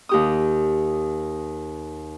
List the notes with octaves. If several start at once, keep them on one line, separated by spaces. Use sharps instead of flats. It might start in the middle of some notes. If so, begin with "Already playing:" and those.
D#2 G4 D#6